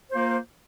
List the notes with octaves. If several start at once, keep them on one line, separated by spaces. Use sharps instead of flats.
A#3 F4 C5